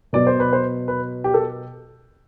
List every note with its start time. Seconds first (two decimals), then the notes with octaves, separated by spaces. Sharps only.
0.13 B2 F#3 B3 D5
0.27 C5
0.40 B4
0.53 C5
0.88 B4
1.24 G4
1.34 A4